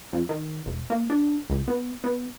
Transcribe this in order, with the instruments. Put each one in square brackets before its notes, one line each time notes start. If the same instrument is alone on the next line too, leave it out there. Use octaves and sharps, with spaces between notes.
[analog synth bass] F2
D#3
E1
A#3
D4
C#2
B3
B3